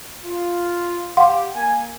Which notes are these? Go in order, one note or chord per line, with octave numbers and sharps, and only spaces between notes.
F4
G4 F5 F#5 C6
A#3 G#5